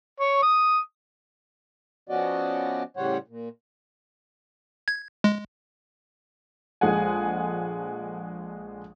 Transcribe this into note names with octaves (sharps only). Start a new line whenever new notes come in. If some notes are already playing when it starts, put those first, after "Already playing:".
C#5
D#6
F3 B3 C#4 F#4 D5 D#5
A2 C#3 G3 C5 C#5 F#5
A#2
G#6
G#3
A#1 G#3 A4 F#5 G#5